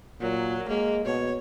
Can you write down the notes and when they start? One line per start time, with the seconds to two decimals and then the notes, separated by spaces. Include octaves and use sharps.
0.21 A#2 F#3
0.68 G#3 A#3
1.05 B2 C#5